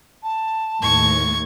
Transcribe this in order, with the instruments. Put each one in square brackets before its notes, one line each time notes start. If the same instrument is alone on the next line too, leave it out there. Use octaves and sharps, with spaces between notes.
[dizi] A5
[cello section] D#2 A2 [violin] C#6 G#6